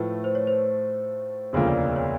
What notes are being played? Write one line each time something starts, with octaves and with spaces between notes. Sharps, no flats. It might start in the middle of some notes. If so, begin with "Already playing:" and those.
Already playing: A2 F3 A3 B4
C5
C#5
C5
E1 D2 C#3 F3 A#3 C#5
D5
C#5